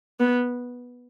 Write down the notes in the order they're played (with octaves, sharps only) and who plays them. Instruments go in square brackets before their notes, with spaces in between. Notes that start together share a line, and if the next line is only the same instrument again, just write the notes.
[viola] B3